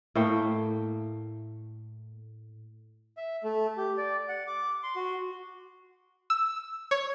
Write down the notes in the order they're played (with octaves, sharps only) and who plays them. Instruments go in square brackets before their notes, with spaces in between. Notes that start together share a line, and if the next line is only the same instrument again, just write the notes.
[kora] A2 A3 A#3 G5
[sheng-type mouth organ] E5
A3
G4
D5
F#5
D6
C6
F#4
[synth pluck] E6
C#5